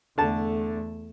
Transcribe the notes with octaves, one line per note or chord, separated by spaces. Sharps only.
E2 D3 A3 A5